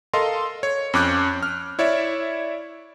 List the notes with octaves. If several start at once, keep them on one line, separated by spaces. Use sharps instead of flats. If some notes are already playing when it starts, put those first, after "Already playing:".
A4 A#4 D#5 F5 C6
C#5
F2 C#4 D6 F#6 G6
F6
E4 C#5 D5 E5